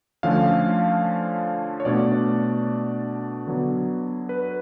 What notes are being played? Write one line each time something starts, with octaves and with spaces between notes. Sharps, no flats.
D3 F3 A3 C#4 F5
C#5
B2 A3 D4 D5
D3 F#3 B3
B4